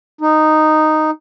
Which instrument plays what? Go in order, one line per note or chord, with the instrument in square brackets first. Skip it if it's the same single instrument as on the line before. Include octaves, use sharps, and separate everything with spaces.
[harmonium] D#4